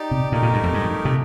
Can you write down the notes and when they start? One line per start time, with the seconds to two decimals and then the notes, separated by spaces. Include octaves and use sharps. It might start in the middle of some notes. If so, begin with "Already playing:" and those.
Already playing: D#4 G4 D5
0.11 C3
0.32 A#2 A3 D#4 G4 A#4
0.43 A#2
0.53 G2
0.63 F2
0.73 G2
1.05 C3